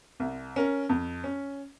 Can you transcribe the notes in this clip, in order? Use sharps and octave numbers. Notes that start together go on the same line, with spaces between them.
C2
C#4 A#4
F2
C#4